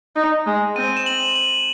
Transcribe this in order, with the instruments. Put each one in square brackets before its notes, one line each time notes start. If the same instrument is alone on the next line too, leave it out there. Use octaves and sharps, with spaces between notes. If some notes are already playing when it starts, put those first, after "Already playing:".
[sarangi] D#4
G#3
[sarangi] C4 [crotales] D#7
[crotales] E7
F#7
F#7